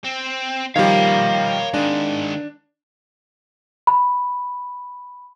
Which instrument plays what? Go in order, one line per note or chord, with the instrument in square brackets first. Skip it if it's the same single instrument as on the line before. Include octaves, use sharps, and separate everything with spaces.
[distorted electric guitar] C4
[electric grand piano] D#3 F3 G3 [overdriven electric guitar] A#4 F5 [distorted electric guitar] C#5 B5
[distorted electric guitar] D#3 G#3 [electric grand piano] D4
[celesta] B5